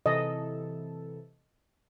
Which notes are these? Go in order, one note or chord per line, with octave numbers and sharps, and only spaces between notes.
C3 E3 A4 D#5